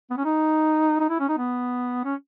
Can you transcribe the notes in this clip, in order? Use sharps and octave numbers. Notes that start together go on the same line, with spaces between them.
B3
C#4
D#4
D#4
E4
C#4
D#4
B3
C#4